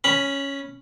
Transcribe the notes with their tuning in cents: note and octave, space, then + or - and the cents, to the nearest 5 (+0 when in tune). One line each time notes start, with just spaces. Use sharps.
C#4 +0 B5 -10